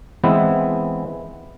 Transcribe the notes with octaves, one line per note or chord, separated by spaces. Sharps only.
E3 G#3 B3 C4 E4